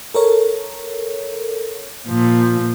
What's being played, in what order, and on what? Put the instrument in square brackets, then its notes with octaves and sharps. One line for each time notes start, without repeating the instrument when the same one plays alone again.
[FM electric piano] A4 A#4 C#5
[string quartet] A#2 F3